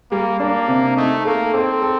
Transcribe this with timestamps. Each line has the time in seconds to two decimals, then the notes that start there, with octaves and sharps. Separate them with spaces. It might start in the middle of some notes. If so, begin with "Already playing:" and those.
0.11 G3 A#3
0.40 A#3 D4
0.69 C3
0.97 A3 D#4
1.25 A#3 A4
1.54 C4 A4
1.82 A4